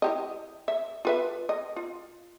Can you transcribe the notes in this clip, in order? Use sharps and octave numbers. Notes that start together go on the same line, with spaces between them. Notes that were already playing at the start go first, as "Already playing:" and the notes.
E4 G4 D#5
E5
F4 B4 E5
D#5
F4